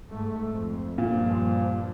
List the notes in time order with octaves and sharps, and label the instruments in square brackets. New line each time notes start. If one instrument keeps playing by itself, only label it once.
[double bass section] G#2 A3
F2
[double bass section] G2 F3 [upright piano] A#2